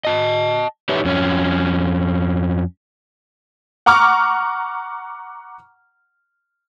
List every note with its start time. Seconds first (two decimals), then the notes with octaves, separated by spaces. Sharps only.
0.05 D#5 A5
0.89 D#4 G4 B4 C#5 E5
1.05 F2 C#4
3.86 F#5 A#5 C#6 D6 F6